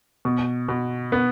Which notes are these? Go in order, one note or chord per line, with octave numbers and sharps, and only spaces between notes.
B2
B2
B3